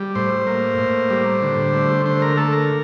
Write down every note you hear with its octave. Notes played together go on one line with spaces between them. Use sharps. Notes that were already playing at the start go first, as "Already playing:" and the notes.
Already playing: G3
A2 C5
A#3
A2
G3
D3
A3
D3 C5
A#4
A3 A4
A#4